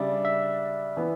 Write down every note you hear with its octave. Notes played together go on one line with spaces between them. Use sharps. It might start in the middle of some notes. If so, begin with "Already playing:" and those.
Already playing: C#3 G3 D4 D5 E5
E5
E3 B3